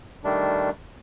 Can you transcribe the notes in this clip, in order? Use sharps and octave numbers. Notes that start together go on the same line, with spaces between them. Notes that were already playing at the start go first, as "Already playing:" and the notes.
D#3 G3 A3 D4